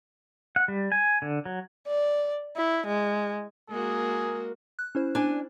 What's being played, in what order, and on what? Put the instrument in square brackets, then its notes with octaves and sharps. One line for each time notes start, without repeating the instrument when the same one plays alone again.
[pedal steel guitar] F#5
G3
G#5
D3
F#3
[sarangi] D5
E4
G#3
[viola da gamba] G#3 A#3 F#4 [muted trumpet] G#4 [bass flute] A#4
[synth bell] F#6
C#4 E4 C5
[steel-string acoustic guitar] D4 G#5